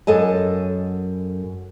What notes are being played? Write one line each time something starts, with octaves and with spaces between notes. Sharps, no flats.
F#2 A4 D#5 G#5